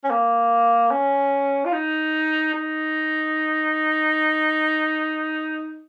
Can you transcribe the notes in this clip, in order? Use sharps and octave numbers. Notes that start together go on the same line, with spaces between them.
C#4
A#3
C#4
F4
D#4
D#4